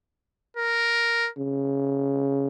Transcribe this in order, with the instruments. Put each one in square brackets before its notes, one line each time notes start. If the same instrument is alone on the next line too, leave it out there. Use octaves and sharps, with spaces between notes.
[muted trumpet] A#4
[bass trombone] C#3